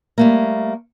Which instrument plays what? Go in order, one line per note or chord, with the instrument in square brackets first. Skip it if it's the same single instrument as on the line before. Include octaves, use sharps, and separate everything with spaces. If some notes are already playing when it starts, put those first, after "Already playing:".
[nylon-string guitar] G3 A3 A#3